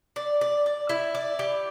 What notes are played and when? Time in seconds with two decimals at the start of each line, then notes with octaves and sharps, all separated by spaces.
0.16 D5
0.41 D5
0.66 D5
0.89 E4
1.15 D5
1.39 G4